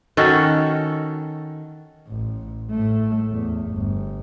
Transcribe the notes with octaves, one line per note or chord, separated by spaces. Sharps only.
D#3 C#4 F#4 A4
A1
A2 A3
E2
G1